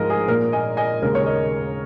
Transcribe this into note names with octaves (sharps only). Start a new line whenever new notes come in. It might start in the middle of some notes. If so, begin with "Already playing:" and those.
Already playing: G#2 F3 G#3 A#4 D#5
G#4
A#2 A#3 A#4
D#5 G#5
D#5 G#5
D#2 C#3 G#3 A#4
C#5
A#4 D#5